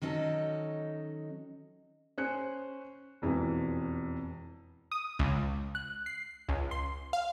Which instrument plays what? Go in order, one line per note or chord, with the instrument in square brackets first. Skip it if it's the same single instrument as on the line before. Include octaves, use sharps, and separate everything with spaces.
[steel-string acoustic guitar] D#3 F#3 C#4 D#4 A4
[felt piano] C#4 C5 F#6 C#7
E1 F2 E3
[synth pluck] D#6
C#2
F#6
C7
C#2
C6
F5